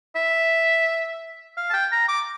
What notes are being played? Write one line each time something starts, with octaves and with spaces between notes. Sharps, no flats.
E5
F5
A5
G5
A#5
D6